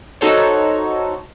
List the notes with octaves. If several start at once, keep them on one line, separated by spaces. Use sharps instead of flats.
D#4 F#4 A4 C5 C#5